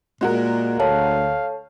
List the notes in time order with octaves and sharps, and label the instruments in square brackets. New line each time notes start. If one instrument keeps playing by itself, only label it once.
[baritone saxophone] A#2 [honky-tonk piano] G#3 F#4 A#4
[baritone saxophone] D2 [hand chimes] A4 C#5 A5 [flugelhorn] F5